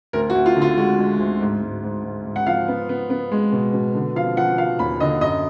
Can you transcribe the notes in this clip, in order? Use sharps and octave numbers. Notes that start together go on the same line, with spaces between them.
D2 A#4
F#4
D2
F4
D3
F4
G#3 F#4
G#3
D2
G#2
G#2
G#2
G#2
G#2
F#5
F3 F5
B3
B3
B3
G#3
B2
B2
D3
F3 F5
F3 F#5
F3 F5
D#2 B5
D3 D#5
F#2 D#5